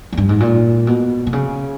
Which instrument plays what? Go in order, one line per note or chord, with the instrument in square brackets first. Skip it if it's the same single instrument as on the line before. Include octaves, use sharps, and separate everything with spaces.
[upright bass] E2
G2
G#2
A#2
B2
B2
C#3